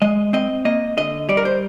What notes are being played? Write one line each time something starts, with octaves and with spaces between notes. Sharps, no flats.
G#3 D#5
C4 D#5
A#3 D#5
D3 D#5
G3 D5
A#4
C5